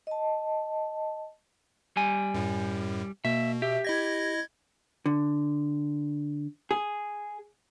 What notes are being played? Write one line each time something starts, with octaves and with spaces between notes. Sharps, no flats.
D#5 A5
G3 G#5
F#2 A2
B2 A#3 E5
G4 E5
E4 D#5 G#6 A#6
D3
G#4